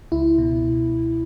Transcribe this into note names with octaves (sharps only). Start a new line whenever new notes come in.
C#2 E4
B2